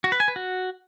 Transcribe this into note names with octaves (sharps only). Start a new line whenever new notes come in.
F#4
B4
G#5
B4
F#4